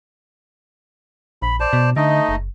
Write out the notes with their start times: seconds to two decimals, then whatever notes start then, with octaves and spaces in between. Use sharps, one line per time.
1.42 A#1 B5
1.60 C5 D5 A5
1.73 B2
1.96 D3 A3 D#4 D#5
2.29 F#1